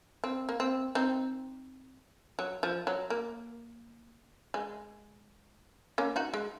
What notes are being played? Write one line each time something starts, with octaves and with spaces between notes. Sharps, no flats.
C4
A#3
C4
C4 D#4
F#3
F3
F#3
A#3
G#3
A#3 C#4
D#4 F#4
G#3